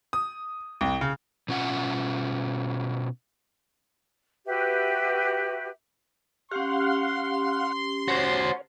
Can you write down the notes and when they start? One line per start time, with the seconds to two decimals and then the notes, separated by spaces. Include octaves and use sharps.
0.13 D#6
0.81 C2
1.01 C#3
1.49 B2 C#4 F4 F#5
4.46 F#4 G4 B4 E5
6.52 C#4 G4 F5 F#5 C6
8.08 F#4 C5 C#5